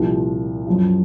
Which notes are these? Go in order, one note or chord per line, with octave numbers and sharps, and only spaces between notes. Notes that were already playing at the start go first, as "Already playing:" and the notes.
Already playing: C2 A#2 F3
F#2 F3